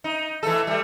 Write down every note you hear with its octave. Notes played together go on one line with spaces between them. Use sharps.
D#4
E3 A3 A4
G3 A3